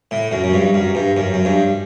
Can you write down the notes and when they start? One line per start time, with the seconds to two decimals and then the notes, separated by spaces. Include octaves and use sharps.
0.11 A2
0.32 F#2
0.44 F#2
0.54 G2
0.74 F#2
0.95 G2
1.17 F#2
1.34 F#2
1.45 G2